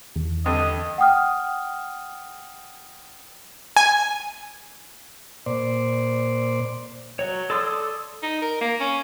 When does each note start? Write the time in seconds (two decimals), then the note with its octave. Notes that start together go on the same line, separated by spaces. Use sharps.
0.16 E2
0.46 G2 D3 D#5
0.98 F#5 G5 D#6 F6
3.77 G#5
5.46 A#2 C5 D5
7.19 F#3 C#5
7.50 A4 D5 C6 D#6 E6
8.23 D#4
8.42 A#4
8.61 A#3
8.80 C#4